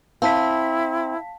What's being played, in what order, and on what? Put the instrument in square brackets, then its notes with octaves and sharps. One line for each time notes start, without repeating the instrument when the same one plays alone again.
[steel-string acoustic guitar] C4 [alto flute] E4 [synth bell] F5 A5 B6